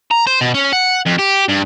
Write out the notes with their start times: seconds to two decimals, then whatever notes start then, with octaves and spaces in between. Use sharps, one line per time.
0.11 A#5
0.27 C5
0.41 B2
0.55 C#4
0.73 F#5
1.06 F2
1.18 G4
1.48 G2